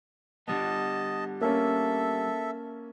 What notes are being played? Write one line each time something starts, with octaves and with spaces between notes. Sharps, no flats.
D3 G3 B3 D#5 A5
A#3 C#4 A4 E5